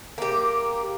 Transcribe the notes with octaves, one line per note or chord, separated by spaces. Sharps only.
A#3 G4